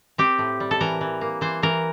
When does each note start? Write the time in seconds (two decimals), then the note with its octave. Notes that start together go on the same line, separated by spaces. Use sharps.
0.18 C4 G4
0.39 A2
0.60 G3
0.71 A4
0.81 E3 A#4
1.01 E3
1.21 A#3
1.41 E3 C5
1.62 E3 A#4